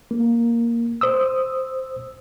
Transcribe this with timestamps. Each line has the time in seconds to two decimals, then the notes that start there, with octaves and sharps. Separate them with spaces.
0.11 A#3
1.01 C5 D#6 E6